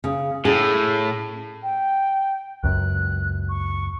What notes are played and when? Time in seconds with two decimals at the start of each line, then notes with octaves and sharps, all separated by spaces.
0.04 C#3
0.45 A2 C#4 G#4
1.63 G5
2.64 C#2 F#2 F#6
3.49 C#6